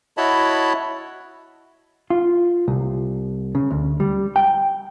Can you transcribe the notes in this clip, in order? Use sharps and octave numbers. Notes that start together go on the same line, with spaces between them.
E4 F#4 C#5 D#5 A5 B5
F4
C2
C#3
D2
G3
G5